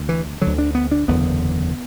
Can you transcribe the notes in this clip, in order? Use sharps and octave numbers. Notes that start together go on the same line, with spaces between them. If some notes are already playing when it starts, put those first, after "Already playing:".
Already playing: D2
E3
D2 D3 F#3
D4
B3
D4
F#1 E2 D3 B3